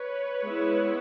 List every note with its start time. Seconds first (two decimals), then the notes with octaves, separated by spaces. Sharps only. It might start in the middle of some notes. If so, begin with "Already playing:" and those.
Already playing: B4 C#5
0.42 G#3 B3 E4